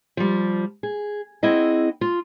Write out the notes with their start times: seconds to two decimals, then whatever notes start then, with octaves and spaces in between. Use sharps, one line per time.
0.17 F3 G3
0.83 G#4
1.43 C4 E4 G#4 D#5 F#5
2.01 F4